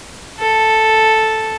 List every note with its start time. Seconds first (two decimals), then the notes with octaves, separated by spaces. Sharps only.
0.40 A4